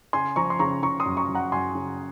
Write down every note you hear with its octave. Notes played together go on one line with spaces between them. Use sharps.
C#3 G#5 C6
F3 A#5 C#6
C6
C#3 A#5 C#6
C#3 A#5 C#6
C6 D#6
F#2
A#5 C#6
F#2
F#5 A#5
F#2 G#5 C6
C#3